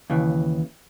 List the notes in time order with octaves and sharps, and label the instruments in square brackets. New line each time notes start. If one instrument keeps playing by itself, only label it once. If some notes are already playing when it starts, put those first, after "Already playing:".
[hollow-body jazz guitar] D#2 C#3 E3